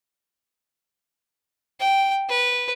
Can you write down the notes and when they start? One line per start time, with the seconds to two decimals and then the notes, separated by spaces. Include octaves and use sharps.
1.80 G5
2.29 B4